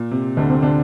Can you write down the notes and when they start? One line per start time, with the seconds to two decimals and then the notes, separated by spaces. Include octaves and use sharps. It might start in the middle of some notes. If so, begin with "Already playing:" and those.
Already playing: A#2
0.11 C3
0.37 D2 D3
0.50 C3 C4
0.63 D3 D4